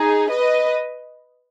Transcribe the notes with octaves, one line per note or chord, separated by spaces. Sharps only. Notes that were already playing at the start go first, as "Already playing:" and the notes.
Already playing: D#4 G#4
B4 D#5